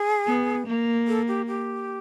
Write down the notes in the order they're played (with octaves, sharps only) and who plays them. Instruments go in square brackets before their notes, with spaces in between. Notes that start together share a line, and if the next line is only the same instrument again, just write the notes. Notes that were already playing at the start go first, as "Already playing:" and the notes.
Already playing: [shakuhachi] G#4
[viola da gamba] B3
A#3
[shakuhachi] A4
G4
G4